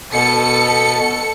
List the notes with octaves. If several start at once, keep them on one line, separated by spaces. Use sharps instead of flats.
B2 A4 C#7